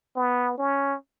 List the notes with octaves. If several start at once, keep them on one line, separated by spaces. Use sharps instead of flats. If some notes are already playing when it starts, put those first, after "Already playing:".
B3
C#4